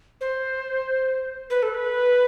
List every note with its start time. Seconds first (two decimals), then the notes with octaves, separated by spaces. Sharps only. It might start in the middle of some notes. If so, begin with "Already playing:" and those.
0.21 C5
1.50 B4
1.63 A4
1.74 B4